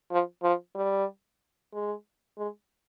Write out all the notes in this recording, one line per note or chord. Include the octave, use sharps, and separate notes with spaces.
F3
F3
G3
G#3
G#3